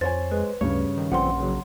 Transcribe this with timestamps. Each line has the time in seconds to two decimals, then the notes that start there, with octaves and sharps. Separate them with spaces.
0.01 F2 C5 C#5 G#5 A6
0.31 G#3 B4
0.61 D2 G2 C#3 C#5
0.98 D#3
1.12 A#1 D3 F3 C4 F#5 C6
1.40 C#3 F#3